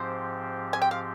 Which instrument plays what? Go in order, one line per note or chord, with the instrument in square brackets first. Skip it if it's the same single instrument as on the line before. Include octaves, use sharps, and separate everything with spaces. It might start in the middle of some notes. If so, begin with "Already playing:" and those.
Already playing: [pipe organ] G#2 F3 C4 G4 [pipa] C5
[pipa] G#5
G5
F5